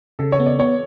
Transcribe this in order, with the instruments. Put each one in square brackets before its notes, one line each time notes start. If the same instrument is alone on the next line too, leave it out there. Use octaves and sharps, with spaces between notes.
[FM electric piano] C#3 [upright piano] A4
[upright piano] C#5
[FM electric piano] B3
[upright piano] D5
[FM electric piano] B3 [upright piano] C#5